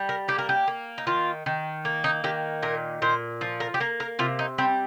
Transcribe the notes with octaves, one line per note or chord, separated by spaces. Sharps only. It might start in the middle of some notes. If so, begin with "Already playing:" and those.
Already playing: G3
A#4
A#3 G4
A#4
G4
A#3
D#4
D#3 F4
D#3
A#3
D#4
D#3 G4
A#2 A#4
A#2 C5
F3
A#4
G4
A#3 A#4
A#4
C3 F4
D#4
G3 C4